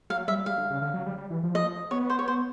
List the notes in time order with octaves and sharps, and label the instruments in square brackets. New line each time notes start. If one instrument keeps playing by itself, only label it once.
[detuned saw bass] F#3 [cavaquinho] F5
[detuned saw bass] G3 [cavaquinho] E5
[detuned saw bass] G3 [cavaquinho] F5
[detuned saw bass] D3
C#3
D3
F#3
G3
G3
E3
F3
[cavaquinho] D#5
[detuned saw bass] B3 [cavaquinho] C#5
[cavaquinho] C5
C#5
C5